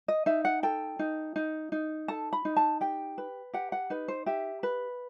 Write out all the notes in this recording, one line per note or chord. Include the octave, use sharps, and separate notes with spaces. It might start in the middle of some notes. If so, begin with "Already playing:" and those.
D#5
D#4 E5
F#5
A4 G5
D#4
D#4
D#4
A4 A5
B5
D#4
A5
G4 G5
B4
G4 F#5
F#5
D#4 B4
C5
G4 E5
B4